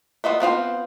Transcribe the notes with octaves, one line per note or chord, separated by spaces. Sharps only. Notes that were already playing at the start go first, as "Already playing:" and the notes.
B3 F4 D#5 E5
B3 C4 F4 C5